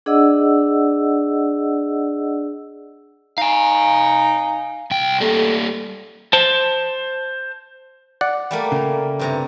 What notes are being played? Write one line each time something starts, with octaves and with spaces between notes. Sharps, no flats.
D4 G#4 D5 D#5 F#5 E6
D#4 F5 G#5
C2 G5
G3 A3 A#3
C5 A5
D5 F#5
G3 A3 A#3
C#3 A#4
G2 C3 A#5